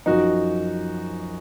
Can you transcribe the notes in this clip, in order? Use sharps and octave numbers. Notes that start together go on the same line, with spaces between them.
F#2 F3 D#4 F#4